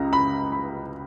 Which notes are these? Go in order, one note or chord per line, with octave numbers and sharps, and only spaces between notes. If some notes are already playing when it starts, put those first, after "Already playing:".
Already playing: C#2 C#3 A#5
B5
B5